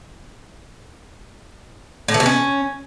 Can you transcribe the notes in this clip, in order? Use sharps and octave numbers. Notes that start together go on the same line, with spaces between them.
A2
E3
B2
C#4